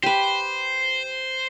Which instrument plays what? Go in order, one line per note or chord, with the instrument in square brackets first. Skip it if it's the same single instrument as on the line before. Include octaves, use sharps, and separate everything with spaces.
[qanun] G4 B4 [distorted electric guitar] C5